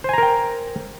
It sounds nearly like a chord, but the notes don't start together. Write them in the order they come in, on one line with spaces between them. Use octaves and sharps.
C5 G#5 A#5 A#4 G5